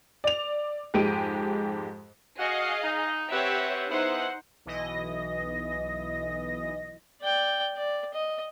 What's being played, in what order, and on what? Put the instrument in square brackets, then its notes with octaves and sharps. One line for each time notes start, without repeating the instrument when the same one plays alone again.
[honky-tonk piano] D5 F7
F2 G#2 G#3 G4 D7 D#7
[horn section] F#4 [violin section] G#4 D#5 F5
[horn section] D#4
[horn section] C4 B4 F#5 [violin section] G4 C#5 E5
[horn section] B3 E4 G#4 [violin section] D#4 C5 F#5
[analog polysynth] B1 E3 D#5 A#6
[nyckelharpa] D5 G5
D5
D#5